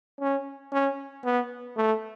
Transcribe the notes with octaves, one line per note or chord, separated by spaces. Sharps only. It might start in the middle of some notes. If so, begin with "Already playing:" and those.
C#4
C#4
B3
A3